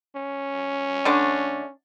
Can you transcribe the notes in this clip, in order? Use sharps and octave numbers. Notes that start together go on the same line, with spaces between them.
C#4
D3 A3 D4